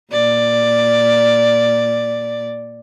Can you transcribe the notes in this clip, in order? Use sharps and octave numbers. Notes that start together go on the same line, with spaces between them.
A#2 D5